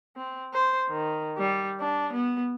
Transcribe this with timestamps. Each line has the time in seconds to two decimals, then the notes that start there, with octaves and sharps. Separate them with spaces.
0.16 C4
0.53 C5
0.89 D#3
1.38 G3
1.80 D4
2.13 B3